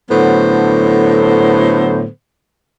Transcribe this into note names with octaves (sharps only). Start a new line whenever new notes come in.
A2 D3 F#3 B3 A4 C5